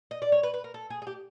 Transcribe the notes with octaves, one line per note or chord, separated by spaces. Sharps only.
D#5
D5
C#5
B4
B4
A#4
A4
G#4
G#4
G4